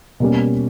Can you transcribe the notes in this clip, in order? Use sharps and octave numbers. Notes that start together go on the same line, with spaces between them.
B2 G3 A#3 C#4